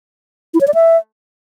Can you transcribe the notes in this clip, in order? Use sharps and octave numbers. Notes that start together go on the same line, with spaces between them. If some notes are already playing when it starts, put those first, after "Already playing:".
E4
C#5
D5
E5